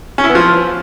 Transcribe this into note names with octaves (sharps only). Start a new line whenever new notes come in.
C#4
E4
B3
F3